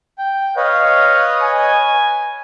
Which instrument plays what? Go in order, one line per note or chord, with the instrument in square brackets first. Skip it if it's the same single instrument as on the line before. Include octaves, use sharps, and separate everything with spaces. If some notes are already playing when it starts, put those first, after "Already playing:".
[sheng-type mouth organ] G5
[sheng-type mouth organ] B4 C#5 D#5 [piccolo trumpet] F5
[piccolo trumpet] G#5